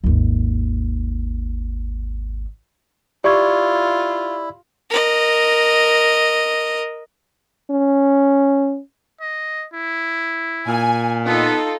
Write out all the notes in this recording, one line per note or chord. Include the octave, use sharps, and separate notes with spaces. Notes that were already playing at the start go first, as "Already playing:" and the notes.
G#1 D#2
E4 F4 G4 D5 C#6 G#6
A#4 D#5
C#4
D#5
E4
A#2 G#5
B3 D#4 F4 A4